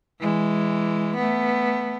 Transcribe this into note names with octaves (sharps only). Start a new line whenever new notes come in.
E3 G#3
A3 B3